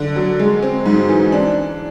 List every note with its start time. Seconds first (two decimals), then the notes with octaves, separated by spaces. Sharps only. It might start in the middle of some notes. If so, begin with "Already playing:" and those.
Already playing: D3 D4
0.16 F#3
0.39 G#3
0.63 C4
0.86 G#2
1.09 E3
1.32 D4